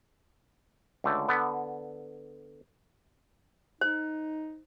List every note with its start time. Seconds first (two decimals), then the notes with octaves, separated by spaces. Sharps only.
1.04 C#2 D3 A3
1.29 D3 B3
3.81 D#4 C5